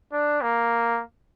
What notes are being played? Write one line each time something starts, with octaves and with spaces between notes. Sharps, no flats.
D4
A#3